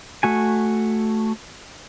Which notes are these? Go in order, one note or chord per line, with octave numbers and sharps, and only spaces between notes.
A3 F#4 G#5